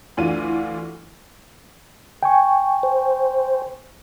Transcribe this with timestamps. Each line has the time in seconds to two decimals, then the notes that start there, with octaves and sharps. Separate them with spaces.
0.17 D2 E3 D4 F4 D#7
2.23 G5 G#5 C#6
2.83 C5